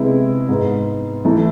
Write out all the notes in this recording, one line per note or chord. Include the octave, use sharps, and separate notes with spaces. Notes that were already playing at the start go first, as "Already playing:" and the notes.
Already playing: C3 G#3 B3 E4
G#2 G#3 B3
E3 A3 E4 A4